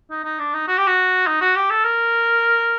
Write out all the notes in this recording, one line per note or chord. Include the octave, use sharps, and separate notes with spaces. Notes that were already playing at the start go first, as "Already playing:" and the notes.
D#4
D#4
D4
D#4
F#4
G4
F#4
D#4
F#4
G4
A4
A#4